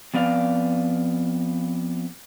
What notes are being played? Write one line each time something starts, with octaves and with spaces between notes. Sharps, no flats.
F2 B3 D5 F5